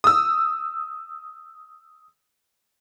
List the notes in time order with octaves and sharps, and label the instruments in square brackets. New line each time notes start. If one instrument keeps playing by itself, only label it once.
[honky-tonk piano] D#6 E6